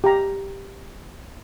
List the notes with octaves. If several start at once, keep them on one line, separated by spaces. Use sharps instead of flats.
G4 A#5